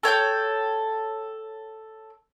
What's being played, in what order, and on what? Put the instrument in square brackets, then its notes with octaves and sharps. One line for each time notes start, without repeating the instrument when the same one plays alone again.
[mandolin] A4 C#5 G5 G6